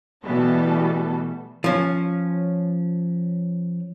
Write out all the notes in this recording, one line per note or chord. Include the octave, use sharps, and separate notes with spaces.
B2 E3 G3 A3 B3 A4
F3 C#4